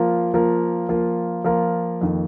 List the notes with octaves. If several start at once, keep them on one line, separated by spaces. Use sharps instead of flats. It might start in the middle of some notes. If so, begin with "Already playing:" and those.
Already playing: F3 A#3 F4 A#4
F3 A#3 F4 A#4
F3 A#3 F4 A#4
F3 A#3 F4 A#4
F2 D#3 A#3